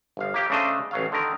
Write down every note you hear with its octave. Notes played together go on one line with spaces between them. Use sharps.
G1 F5
A#3 G4 G5
C#3 A3 D4 C5 D#5
A1 F#3 F5
D3 D#3 A#4